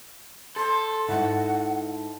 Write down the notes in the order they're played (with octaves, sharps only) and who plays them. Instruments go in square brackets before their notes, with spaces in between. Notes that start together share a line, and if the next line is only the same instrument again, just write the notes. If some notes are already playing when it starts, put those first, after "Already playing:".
[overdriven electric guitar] A4 [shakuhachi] C6
[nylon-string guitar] G#2 E4 [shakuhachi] F#5